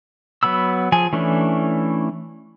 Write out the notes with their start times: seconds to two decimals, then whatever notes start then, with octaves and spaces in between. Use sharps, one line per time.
0.43 F#3 B3 B5 E6
0.92 F3 G#4 G#5
1.13 E3 A3 C#4 D4 E4